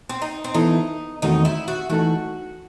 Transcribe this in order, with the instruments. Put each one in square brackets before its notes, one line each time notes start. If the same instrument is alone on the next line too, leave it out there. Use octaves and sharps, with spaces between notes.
[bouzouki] C4
D#4
C4
[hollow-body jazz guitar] E3 B3 E4 A4 [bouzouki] D#4
[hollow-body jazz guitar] E2 D#3 A3 C4 F#4 [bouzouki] D#4
[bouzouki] E4
F#4
[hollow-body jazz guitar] E3 A3 D#4 A4 [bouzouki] F#4